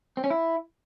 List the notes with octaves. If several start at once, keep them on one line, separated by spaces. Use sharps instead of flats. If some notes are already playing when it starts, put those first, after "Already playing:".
C4
C#4
E4